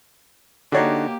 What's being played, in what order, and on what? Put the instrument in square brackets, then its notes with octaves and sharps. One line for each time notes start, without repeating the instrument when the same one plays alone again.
[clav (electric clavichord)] D3 D4 D#4 [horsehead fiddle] A#3 G4 [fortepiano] F#4 C#5